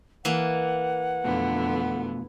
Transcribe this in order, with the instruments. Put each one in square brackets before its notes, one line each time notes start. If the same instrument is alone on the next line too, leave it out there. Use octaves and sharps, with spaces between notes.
[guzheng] E3 A#3 [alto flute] F#5
[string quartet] F2 D3 B3 [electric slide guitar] B2 A3 F4